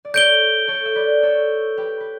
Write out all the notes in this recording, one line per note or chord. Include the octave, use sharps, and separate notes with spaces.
D5
A4 C#5 G6 D7 G7
A4 C#5
E5
B4 D5
A4 C#5
G4 B4
B4